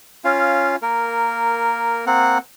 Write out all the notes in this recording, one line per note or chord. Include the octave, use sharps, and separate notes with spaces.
C#4 F4 F5
A#3 A#4
A#3 C4 F#5